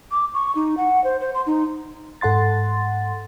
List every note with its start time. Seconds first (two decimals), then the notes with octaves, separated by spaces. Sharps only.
0.11 D6
0.34 C#6
0.55 D#4
0.77 F#5
1.04 C5
1.21 C5
1.35 C6
1.47 D#4
2.21 G#2 A4 F#5 C6 A6